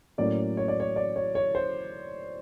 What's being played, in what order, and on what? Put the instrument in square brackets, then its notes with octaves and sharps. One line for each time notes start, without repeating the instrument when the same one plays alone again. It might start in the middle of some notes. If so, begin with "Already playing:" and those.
[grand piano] A2 F#3 A#3 C#4 D5
C#5
D5
C#5
D5
C#5
C#5
C5